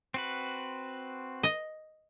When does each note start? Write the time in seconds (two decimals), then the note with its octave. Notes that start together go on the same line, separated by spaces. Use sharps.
0.14 C4 F#4 B4
1.43 D#5